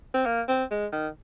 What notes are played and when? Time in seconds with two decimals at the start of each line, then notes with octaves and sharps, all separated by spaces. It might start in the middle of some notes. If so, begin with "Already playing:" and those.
0.14 C4
0.26 A#3
0.48 C4
0.70 G#3
0.92 D#3